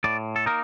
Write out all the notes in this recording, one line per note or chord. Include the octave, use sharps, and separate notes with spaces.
A2 D5
A4
A#3 D#4 A#4